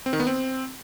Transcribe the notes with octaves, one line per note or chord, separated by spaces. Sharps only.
C4
D#3
B3
C4